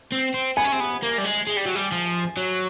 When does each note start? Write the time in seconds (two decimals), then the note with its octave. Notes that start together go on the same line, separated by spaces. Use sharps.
0.12 C4
0.34 C4
0.57 B3 G#5
0.65 C#4
0.72 C4
0.80 B3
1.02 A#3
1.18 G3
1.24 G#3
1.47 G#3
1.57 G3
1.66 F#3
1.75 G3
1.92 F3
2.37 F#3